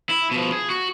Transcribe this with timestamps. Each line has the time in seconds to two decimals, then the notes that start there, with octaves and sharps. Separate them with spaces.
0.09 E4
0.31 B2 F3
0.52 G#4
0.70 F#4